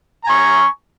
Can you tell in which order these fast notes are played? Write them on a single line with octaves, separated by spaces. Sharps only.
A#5 G#5 C#6